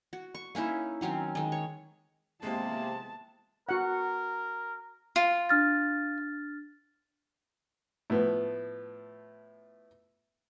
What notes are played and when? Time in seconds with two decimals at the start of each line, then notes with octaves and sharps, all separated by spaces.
0.13 F#4
0.35 C#6
0.55 A#3 C#4 D#4 E4
1.01 D#3 F#3 C4 C#4
1.35 D#3 G#3
1.52 C#5
2.43 C3 G#3 A#3 B3 A5
3.69 F#4 A#4 F#5
5.16 F4
5.49 D4 F6 A6
8.10 A2 F3 B3